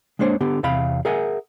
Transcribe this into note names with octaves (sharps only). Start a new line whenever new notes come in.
G#3 A#3 D4 C5 C#5
D3 B3 G4
E2 C3 F5 B5
G#4 A#4 E5 F#5 G#5